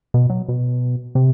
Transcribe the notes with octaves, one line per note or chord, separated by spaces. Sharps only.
B2
F#3
B2
C3